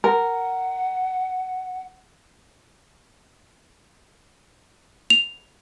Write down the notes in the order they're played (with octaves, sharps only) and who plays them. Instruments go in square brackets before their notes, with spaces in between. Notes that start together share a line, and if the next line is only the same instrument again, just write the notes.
[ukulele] A#4 [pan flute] F#5
[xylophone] F7